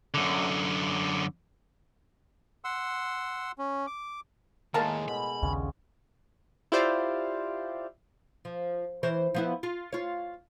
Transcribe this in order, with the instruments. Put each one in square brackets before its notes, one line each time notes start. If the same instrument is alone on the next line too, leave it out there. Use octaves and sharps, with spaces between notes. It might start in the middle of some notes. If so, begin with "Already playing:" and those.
[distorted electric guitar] F#2 D3
[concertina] F#5 C6 E6
C#4
D6
[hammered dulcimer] A2 G#3 [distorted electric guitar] D#3 A#3 [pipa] A#4 F5 A5
[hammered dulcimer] B2 [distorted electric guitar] B5
[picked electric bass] A#1 D#2 C#3 [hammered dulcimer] C#4
[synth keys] E4 F4 G4 C5 D5 F5
[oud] F3
E3 C5 C#5
F3 B3 E4
F4
F4 C#5